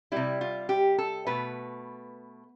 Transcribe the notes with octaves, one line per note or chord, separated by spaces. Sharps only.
C3 G3 E4
F4
G4
A4
B2 A3 B4